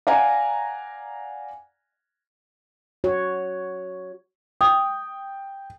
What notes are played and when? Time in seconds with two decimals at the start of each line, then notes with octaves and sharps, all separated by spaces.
0.07 D5 F5 F#5 G#5 A#5
3.04 F#4 C#5
4.61 G5 D#6